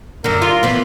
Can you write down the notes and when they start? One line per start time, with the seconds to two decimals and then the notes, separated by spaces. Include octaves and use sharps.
0.24 F#2 D3 A#4
0.42 F4
0.63 E3 F3 B3